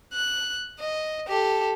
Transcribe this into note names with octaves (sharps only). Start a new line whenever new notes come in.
F#6
D#5
G4 A4